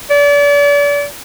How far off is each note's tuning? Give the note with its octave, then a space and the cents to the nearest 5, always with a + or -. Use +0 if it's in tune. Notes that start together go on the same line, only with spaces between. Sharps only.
D5 -35